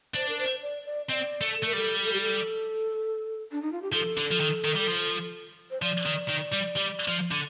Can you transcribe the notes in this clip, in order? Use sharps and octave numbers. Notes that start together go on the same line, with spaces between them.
D4 C5
A#4
C5
D5
D5
C4 D5 D#5
A3
A4
A3 A#4
G3 A4
A4
G4
A4
D4
D#4
F4
G4
F3 A4
D3
F3
D#3
D#3
G3
F3
C5
F3 D5
D#3
D#3
G3
G3
F3
D3